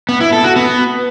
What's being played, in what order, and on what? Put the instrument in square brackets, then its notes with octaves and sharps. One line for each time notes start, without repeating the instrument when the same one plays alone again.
[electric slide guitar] B3
E4
A4
F#4
B3